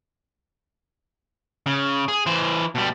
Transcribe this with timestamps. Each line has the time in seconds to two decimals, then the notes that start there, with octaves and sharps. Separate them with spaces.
1.66 C#3
2.08 G#4
2.26 E3 C5
2.75 B2 G3